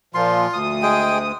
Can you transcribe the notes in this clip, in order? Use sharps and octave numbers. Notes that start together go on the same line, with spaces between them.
A#2 F3 F4 C6
D2 D#6
G#3 G#4 G5